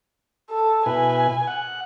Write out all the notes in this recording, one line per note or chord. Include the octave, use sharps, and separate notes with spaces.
A4
B2 E4 B4 G#5
F#5